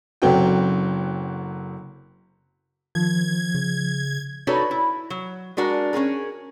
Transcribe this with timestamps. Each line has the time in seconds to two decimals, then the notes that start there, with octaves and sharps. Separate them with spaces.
0.22 F#1 F#3 C4 F#4 A4 G5
2.95 D#3 F3 G#6
3.55 C#3
4.47 D#4 F#4 A4 B4 C#5 D5
4.71 E4
5.10 F#3
5.57 G#3 D4 F#4 A#4
5.93 C#4 F#4 G#4 A#4